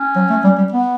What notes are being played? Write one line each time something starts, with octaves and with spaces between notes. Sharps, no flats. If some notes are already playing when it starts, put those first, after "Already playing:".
Already playing: C#4
F#3
A3
G3
G3
B3